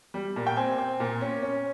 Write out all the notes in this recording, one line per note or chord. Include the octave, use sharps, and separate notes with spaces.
G3
A#2
G5
C4 G#5
C4
A#2
C#4
C#4